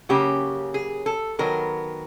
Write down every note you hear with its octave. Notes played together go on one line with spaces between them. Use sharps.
C#3 F#3 A#3 C#4 G4
G#4
A4
D#3 F#3 B3 A#4